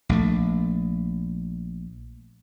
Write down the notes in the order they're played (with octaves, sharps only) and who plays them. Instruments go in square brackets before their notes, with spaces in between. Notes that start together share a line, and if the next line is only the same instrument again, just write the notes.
[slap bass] A#1 A3